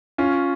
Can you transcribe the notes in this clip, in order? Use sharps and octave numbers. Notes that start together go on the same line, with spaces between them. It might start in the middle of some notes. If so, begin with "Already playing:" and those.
C#4 F4